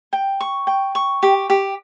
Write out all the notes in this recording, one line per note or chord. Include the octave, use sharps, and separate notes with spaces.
G5
C#6
G5
C#6
G4
G4